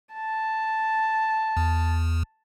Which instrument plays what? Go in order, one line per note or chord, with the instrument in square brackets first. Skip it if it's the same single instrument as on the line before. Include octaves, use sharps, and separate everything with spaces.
[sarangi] A5
[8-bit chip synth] E2